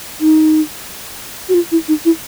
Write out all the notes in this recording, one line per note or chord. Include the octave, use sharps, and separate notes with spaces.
D#4
F#4
F4
E4
D#4
E4